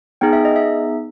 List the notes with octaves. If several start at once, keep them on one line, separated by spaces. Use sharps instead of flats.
B3 D#4 G#4 G5
E5
D#5
E5